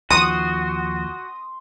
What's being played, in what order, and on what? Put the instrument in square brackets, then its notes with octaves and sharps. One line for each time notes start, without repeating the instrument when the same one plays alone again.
[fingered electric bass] D#2 F3 [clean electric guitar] F#4 [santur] C6 [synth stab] D#6